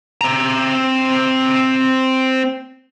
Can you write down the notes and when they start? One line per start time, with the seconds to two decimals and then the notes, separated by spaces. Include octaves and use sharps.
0.21 C4 A#5